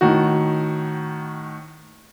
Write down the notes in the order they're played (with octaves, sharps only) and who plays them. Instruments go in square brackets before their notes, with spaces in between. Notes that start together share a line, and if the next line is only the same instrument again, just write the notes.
[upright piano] A2 D#3 F#4